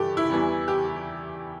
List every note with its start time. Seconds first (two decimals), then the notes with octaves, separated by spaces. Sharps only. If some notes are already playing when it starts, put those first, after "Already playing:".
Already playing: G2 E3 G3 G4 A4
0.17 E4
0.30 E2 E3 G3
0.68 G4